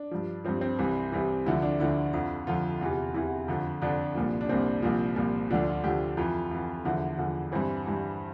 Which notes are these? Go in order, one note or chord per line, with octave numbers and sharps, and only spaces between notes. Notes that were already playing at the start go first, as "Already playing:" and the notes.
Already playing: D4
G2 F3
G2 F3 C4
C4
C2 C3 E3
C2 C3 E3
D2 D3 F3 E4
D4
D2 D3 F3 E4
F2 D3 F3
F2 D3 F3 F4
E2 C3 E3
E2 C3 E3 E4
F2 D3 F3
F2 D3 F3 D4
C2 A#2 F3
D4
C2 A#2 F3 C4
C2 A#2 F3
C2 A#2 F3
D2 D3 F3 D4
F4
D2 D3 F3 G4
F2 E3 F4
F2 E3
E2 D3 F3 E4
E2 D3 F3
G2 E3 C4
G2 E3